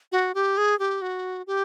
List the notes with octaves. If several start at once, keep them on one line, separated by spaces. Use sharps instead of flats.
F#4
G4
G#4
G4
F#4
G4